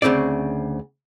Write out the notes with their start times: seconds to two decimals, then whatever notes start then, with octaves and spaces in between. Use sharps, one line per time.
0.02 D2 G#2 C#3 C4 D5